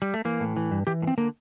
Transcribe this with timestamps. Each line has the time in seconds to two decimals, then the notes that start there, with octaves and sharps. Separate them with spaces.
0.02 G3
0.14 A3
0.25 E3 A#3
0.40 A2
0.57 E3
0.71 G2
0.87 E3 G4
1.02 A2
1.07 C4
1.18 D3 A#3